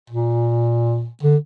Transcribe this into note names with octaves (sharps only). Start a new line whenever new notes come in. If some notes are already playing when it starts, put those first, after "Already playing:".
A#2
D3